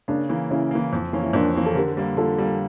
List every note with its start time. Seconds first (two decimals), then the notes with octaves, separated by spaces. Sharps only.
0.08 C#3 A#3 D4
0.29 E3 A#3
0.50 C#3 C#4 E4
0.71 E3 A#3
0.93 F2
1.13 E3 A#3 C#4
1.22 E4
1.33 F2 A#3 D4
1.54 E3 A#3 C#4
1.66 A4
1.75 D3 G4 A#4
1.97 G3 A#3
2.17 D3 F4 A4
2.38 G3 A#3